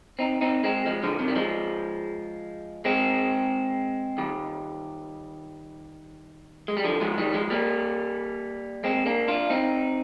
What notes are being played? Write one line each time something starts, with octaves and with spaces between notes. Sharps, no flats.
C4 D#4
C4 D#4
G#3 C4
F3 G#3
D3 F3
C3 D#3
G3
F3 G#3
G#3 C4
D#3 G3
G#3
G3
D3 F3
F3 G#3
D#3 G3
F3 G#3
G3 A#3
G#3 C4
A#3 D4
D4 F4
C4 D#4